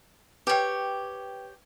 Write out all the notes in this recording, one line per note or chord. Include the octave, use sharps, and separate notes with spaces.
G4 B4 C#5 G5